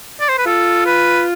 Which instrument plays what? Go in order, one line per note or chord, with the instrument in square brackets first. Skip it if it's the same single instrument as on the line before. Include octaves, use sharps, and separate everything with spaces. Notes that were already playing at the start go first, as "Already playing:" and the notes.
[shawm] D5
C5
B4
[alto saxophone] F4 [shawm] A4
[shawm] B4